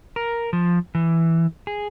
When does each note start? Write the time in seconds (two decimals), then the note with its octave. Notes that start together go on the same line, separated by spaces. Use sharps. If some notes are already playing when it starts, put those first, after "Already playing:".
0.16 A#4
0.53 F3
0.95 E3
1.67 G#4